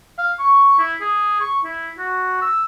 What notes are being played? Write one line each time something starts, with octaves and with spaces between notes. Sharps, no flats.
F5
C#6
E4
G#4
C#6
E4
F#4
E6